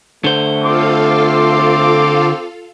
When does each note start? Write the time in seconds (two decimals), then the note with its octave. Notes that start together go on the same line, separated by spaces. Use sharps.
0.24 D3 A3 C5
0.63 C4 F4 A4 F5 C6 D6